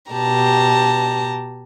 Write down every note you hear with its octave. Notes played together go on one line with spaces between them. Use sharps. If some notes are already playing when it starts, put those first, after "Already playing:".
B2 G4 A5 A#5